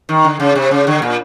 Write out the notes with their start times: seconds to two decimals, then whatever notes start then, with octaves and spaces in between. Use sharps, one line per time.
0.09 D#3
0.24 D3
0.40 C#3
0.55 C3
0.71 C#3
0.87 D3
1.02 A#2